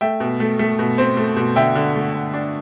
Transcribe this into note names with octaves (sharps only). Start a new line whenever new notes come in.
A3 E5 G5
B2
A3
A3
B2
C4
A3
B2
D3 E5 G5
D3
A3
D3
D4